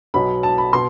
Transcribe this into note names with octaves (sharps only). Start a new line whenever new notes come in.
B1 B2 F#3 B5
A5
B5
B2 C6